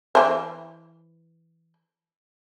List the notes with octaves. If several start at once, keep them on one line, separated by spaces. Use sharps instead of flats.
E3 C5